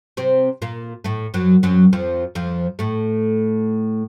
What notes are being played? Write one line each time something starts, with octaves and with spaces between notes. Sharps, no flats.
C3 C4
A#2 A#3
A2 A3
F#2 F#3
F#2 F#3
F2 F3
F2 F3
A2 A3